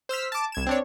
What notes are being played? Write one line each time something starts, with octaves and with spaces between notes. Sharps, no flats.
C5 E6 F6 B6
A5 D6
C2 G#6 E7
C4 D4 C#5